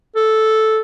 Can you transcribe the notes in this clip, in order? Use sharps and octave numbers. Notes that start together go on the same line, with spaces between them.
A4